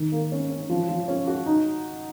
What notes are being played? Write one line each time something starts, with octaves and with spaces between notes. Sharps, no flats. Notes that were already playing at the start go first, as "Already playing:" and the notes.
Already playing: D#3
A#3
C#4
C#4
F3
F3
C#4
F#4
D#4